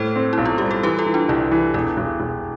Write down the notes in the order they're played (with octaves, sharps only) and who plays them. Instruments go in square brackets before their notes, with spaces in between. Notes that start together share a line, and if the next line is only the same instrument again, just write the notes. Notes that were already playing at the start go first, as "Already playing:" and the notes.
Already playing: [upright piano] A2 [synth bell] A4 C5
[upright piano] C4
[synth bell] E4
[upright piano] B1
[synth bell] F4
[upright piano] G3 [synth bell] G4
[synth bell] A4
[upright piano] E3 [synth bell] G4 B4
[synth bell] F4 A4
[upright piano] E3
[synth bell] D4 F4
[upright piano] C2 [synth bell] E4
[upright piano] E3
[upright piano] E1 [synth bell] E4
[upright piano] E1
E1